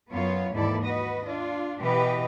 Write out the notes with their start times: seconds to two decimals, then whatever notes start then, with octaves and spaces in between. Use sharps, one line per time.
0.12 F#2 B3 F4 C#5
0.54 D#2 G#2 E3 E4 A4 D5
0.83 F#4 B4 D#5
1.26 D4 F4
1.80 B2 E3 G4 B4 D#5